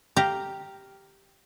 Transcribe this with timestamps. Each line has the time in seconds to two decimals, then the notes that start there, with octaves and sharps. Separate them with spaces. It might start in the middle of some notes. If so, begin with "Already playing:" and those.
0.17 G4 F5 A#5